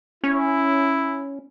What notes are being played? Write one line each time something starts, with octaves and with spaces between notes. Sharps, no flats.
C#4 E4